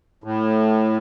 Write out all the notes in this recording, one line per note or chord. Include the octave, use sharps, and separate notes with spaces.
A2